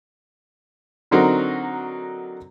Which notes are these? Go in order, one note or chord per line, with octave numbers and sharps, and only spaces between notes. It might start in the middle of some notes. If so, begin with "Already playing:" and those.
D3 F#3 C4 D#4 F#4 A#4